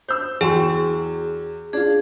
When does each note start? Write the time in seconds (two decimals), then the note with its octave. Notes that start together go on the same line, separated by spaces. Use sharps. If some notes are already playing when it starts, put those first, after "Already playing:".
0.08 C5 E6 G6
0.41 E2 F#4 G#4 G5 G#5 E7
1.73 D4 F4 G#4